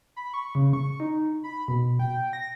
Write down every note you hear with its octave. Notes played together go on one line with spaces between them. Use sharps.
B5
C#6
C#3
C#6
D#4
B5
B2
G5
A#6